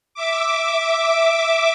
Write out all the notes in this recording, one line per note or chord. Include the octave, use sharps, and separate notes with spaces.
E5 D6